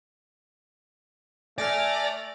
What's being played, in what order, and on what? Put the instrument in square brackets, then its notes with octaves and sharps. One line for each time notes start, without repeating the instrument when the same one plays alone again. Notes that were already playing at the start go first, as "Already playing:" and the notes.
[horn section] A3 G#5 [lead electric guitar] D5 [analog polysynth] F6 A6 A#6